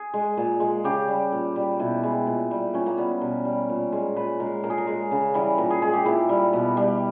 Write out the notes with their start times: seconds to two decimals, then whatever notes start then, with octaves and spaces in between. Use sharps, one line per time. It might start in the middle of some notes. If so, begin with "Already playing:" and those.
Already playing: G#4
0.14 G#3
0.37 A#2
0.60 G#3
0.84 C#3 G4
1.08 G3
1.32 A#2
1.56 G3
1.79 B2 E4
2.03 G#3
2.27 A#2
2.51 G3
2.73 A#2 C#4
2.86 A#3
2.97 G3 B3
3.21 B2 A#4
3.45 G3
3.69 A#2
3.92 G#3
4.16 A#2 B4
4.40 G#3 A#4
4.63 A#2 A#4
4.70 G#4
4.78 A#4
4.87 G#3
5.11 C#3
5.34 E3 G3
5.58 A#2 A#4
5.70 G#4
5.82 G#3 G#4
5.94 G4
6.05 A#2 E4
6.29 G3
6.53 B2
6.77 G3